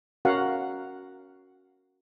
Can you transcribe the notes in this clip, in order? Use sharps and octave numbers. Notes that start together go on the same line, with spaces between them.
C#4 F#4 A#4 F5 F#5